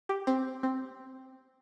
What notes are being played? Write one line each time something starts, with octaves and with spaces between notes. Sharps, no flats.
G4
C4
C4